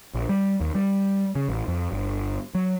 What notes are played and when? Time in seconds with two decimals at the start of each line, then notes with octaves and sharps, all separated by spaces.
0.14 A#1
0.29 G3
0.61 D#2
0.75 G3
1.35 C#3
1.49 A1
1.68 F2
1.92 G1
2.55 F#3